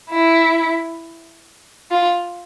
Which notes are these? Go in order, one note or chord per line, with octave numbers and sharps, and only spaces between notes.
E4
F4